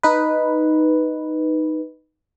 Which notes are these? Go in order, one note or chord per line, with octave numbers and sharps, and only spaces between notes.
D#4 B4